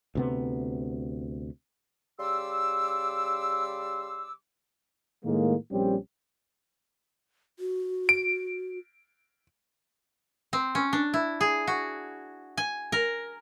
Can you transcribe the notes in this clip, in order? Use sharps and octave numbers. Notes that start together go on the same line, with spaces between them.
D2 C3 B3
C#3 G3 C6 D6 E6
A2 D#3 G#3 A#3
A#1 G3 C4 C#4 G4
F#4
D7
C4
C#4
D4
E4
G#4
F#4
G#5
A#4